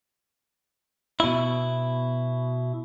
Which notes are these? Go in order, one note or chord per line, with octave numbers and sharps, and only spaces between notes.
B2 E4